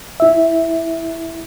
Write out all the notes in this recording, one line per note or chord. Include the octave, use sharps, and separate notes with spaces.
E4 E5